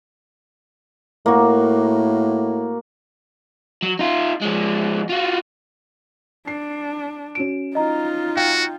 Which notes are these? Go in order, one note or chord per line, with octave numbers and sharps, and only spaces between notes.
A2 A#3 F#4
F#3
D#4 F4
F3 G#3
F4 F#4
D4 C7
C#4 F#4 D7 E7
D#4 F4 D#5 A#5
F#4 F5 G5